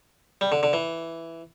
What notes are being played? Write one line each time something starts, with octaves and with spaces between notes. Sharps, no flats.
G3
D3
D3
E3